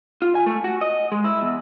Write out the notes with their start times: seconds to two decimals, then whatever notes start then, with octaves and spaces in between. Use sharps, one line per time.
0.22 F4
0.35 G#5
0.46 A3
0.64 F#4
0.81 D#5
1.12 G#3
1.24 E4
1.41 E2